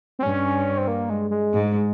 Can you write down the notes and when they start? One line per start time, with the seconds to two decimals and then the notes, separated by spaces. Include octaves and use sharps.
0.19 C4
0.23 G2 C#4
0.78 C4
0.88 A#3
1.10 G#3
1.31 G#3
1.53 G#2